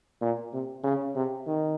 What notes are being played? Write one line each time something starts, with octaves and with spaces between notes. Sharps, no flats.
A#2
C3
C#3
C3
D#3